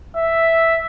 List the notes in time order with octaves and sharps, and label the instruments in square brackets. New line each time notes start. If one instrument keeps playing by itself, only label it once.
[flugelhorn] E5